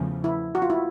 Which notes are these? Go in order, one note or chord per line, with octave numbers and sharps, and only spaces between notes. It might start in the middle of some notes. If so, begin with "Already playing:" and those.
Already playing: E2 C#3 F3 A3
E4
F#4
F4
E4